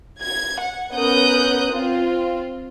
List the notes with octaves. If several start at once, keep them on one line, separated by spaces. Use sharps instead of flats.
G#6
F#5
B3 C#4 A#4 D#6 F#6 G6
C4 F4